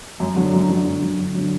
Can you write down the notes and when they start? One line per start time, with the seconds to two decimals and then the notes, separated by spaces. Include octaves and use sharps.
0.20 F#2
0.36 D3 F#3
0.53 F#2
0.69 D3 F#3
0.85 F#2
1.02 D3 F#3
1.18 F#2
1.34 D3 F#3